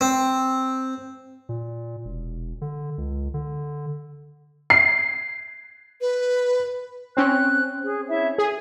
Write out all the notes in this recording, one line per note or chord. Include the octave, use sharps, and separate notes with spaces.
C4
A#2
E1
D3
C#2
D3
C7
B4
C4 C#4 F#6
G#4
E4 C#5 E5
G#4 G#5